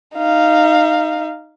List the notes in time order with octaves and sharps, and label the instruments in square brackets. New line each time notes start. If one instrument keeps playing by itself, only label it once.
[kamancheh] D#4 F5